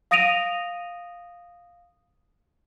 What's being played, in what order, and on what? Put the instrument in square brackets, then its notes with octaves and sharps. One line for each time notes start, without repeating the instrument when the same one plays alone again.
[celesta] F5 D#6 A#6 D7 D#7 F7